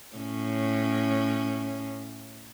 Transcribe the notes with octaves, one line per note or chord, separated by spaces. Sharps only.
A2 C#4